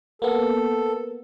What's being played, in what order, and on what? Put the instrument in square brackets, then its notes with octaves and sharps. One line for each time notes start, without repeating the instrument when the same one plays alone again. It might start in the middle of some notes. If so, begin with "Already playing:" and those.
[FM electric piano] A#3 B3 [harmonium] A4